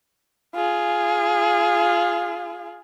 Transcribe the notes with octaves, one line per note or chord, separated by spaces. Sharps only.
F4 G#4